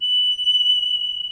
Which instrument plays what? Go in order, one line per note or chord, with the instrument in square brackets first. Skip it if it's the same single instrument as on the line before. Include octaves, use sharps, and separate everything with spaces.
[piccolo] F#7